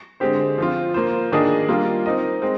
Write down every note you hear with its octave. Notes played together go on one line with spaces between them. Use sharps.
D3 G#3 C4 G4 C5
F3 C4 F4
A#3 F4 C5
D#3 A#3 D4 G#4 D#5
G3 A#3 F4
C4 D#4 A#4 D#5
G#3 C4